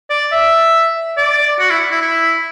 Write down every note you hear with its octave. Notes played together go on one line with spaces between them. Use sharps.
D5
E5
D5
F#4
E4
E4
E4